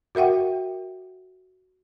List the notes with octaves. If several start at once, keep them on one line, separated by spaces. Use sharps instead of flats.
F#4 A#4 E5 F#5 G5